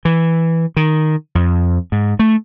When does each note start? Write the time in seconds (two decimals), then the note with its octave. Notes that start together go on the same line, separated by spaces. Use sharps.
0.05 E3
0.76 D#3
1.35 F2
1.92 G#2
2.19 A3